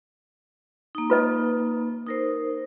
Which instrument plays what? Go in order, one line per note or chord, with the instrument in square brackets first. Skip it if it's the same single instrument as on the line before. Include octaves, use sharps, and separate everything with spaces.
[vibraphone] A#3 D#4
[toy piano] F4 B4 D#5
[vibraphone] D#4 A#4 C5